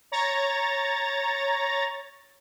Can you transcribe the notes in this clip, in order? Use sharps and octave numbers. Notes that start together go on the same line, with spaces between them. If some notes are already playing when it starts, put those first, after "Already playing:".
C#5 A#5 A6